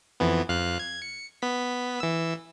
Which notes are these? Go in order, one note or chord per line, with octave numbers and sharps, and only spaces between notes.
F2 E3 B3
F2 F5 F#6
G#6
C#7
B3 B6
E3 E6